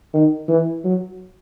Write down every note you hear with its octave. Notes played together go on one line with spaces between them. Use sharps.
D#3
E3
F#3